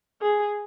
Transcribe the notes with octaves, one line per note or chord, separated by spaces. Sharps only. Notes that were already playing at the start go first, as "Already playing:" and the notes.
G#4